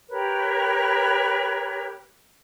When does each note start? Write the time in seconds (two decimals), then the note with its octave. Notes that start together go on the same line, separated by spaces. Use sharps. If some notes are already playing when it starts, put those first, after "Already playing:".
0.09 G4 A#4 B4 C#5